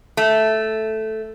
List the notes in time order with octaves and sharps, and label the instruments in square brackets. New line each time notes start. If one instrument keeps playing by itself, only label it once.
[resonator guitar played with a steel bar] A3